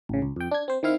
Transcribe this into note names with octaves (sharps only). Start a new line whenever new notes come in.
A1 C#3
C#2
F2 G5
D4 G#6
C4 C5
D#3 C4 E4 F5